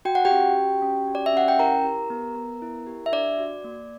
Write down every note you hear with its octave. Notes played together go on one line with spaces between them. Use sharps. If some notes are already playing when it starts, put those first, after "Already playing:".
F#4 G5
F#5
G4 G5
C#4
F#4
C#4
F#4
D5
E5
C#4 F#5
G5
E4 A#4 A#5
G4
B3
B3
E4
G4
E5
D4 D5
F#4
A#3